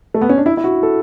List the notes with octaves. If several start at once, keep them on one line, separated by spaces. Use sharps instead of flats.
A3
B3
C#4
D4
E4
E4
F#4
A4